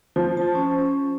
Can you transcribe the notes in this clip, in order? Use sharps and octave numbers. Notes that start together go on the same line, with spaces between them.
F3 F4
F4 A5
C#4